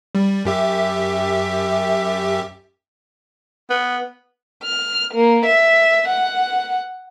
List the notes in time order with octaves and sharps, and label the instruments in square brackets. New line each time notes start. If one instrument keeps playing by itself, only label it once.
[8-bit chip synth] G3
F#2 G4 E5
[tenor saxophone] B3
[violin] F6
A#3
E5
F#5